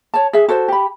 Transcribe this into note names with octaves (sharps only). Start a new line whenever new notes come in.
C#5 A5
G#4 E5
F#4 A4 C5
G4 B5